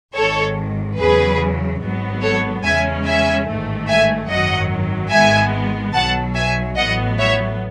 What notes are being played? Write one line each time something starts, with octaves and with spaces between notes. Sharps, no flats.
G#1 G#2 D#3 A4 C#5
E2 C#3 F#3 G#4 B4
G#1 G#2 F#3 B3
A4 C#5
E2 C#3 G#3 C#4 E5 G#5
E5 G#5
A1 G#2 D#3 A3
E5 G#5
G#1 F#2 D#3 F#3 D#5 F#5
G#1 G#2 D#3 G#3 B3 E5 G#5
B1 B2 F#3 F#5 A5
E5 G#5
A1 A2 F#3 B3 D#5 F#5
C#5 E5